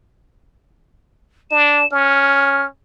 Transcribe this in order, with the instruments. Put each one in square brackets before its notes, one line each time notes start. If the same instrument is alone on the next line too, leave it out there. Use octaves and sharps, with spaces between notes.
[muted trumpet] D4 [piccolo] E7
[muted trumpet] C#4 [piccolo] F6